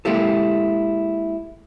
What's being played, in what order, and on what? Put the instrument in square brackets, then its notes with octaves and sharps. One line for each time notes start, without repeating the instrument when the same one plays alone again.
[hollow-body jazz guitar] G#3 A#3 E4 G4 A4